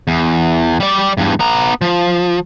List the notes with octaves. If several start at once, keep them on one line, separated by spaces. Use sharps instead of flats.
E2
G3 D5
E2 G2
B3 A#5
F3